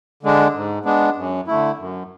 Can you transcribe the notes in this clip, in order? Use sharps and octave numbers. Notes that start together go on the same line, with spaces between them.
D3 G#3 D4
G#2
G#3 B3 D4
F#2
D3 A3 E4
F#2